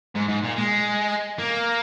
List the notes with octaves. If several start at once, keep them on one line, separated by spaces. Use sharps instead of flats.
G#2
G#2
A#2
G#3
A#3